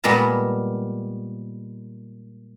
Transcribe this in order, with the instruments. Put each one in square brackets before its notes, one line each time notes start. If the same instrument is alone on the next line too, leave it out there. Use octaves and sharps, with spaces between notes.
[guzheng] A#2 G3 G#3 B3 A#4 A5